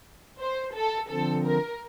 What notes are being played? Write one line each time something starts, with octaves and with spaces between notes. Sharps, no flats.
C5
A4
D3 F3 C4 A4
A#4